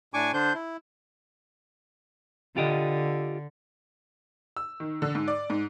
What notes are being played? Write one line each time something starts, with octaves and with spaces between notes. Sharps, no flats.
A2 D4 G#5 C#6 D6
D3 D4 C5 G6
E4
D3 F4 G4 D#5
E6
D#3
D3
G#2
D5
G#2